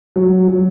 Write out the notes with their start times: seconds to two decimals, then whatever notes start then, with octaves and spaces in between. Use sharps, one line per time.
0.16 F#3
0.48 F#3